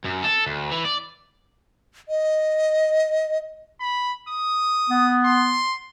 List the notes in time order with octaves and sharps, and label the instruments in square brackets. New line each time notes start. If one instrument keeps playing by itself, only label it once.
[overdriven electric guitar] F#2
A4
D2
E3
D5
[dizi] D#5
[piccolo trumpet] B5
D#6
[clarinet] B3
[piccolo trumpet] C6